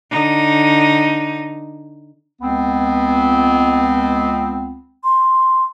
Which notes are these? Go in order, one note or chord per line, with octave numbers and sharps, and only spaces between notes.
D3 D#4
C#2 B3 C4
C6